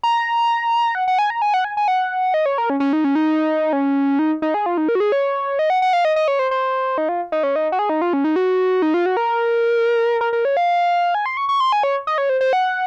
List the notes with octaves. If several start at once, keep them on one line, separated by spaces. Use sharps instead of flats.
A#5
F#5
F#5
G#5
A#5
G#5
F#5
G#5
G#5
F#5
D#5
C#5
A#4
C#4
C#4
D#4
C#4
D#4
C#4
D#4
D#4
G#4
F4
D#4
A#4
F#4
G#4
C#5
D#5
F#5
F#5
F5
D#5
D#5
C#5
C5
C5
D#4
F4
D#4
C#4
D#4
F#4
G#4
D#4
F4
C#4
D#4
F#4
D#4
F4
F#4
A#4
A#4
A#4
C#5
F5
G#5
C6
C#6
C#6
C6
G#5
C#5
D#5
C#5
C5
C5
F#5